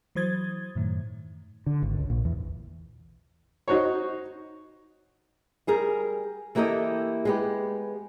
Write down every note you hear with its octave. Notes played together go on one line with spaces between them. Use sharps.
E3 F#3 C5 D#6 G#6 A6
F#2 A2 D#3
D3
G#1
C#2
A#1
E2
D#4 F#4 C5 C#5
G3 G#4 A#4
E3 A#3 E4 G4 A4 D#5
G#3 B3 G4